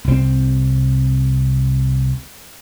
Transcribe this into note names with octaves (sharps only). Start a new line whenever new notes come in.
C2 C4